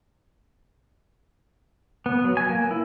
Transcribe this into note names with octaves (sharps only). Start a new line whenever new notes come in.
B3
F#3
G#5
A#3
E4